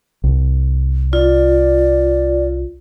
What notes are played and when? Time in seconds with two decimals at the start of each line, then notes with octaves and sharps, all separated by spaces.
0.24 C2
1.13 F4 D5